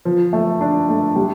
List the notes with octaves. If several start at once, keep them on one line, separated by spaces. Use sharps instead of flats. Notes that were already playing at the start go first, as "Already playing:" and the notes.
F3
A3
D4
A3
G3